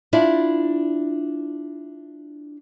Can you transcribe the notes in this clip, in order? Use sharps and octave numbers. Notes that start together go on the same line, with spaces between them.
D4 E4 F4 D5